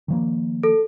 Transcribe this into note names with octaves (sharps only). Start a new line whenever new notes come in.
D#3 F3 A#3
A4